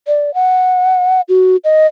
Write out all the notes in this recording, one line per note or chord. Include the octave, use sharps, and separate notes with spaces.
D5
F#5
F#4
D#5